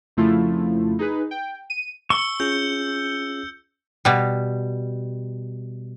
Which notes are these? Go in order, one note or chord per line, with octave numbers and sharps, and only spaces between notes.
F2 C#3 F3 A3 E4 F4
D#4 G#4 B4
G5
D#7
C#6 E6 C#7 G7
C#4 F4 G#4 G6
B2 G3